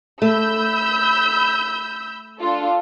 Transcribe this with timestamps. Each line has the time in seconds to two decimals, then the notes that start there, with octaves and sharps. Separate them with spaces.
0.22 A3 B5 E6 G6
2.39 D4 F4 A4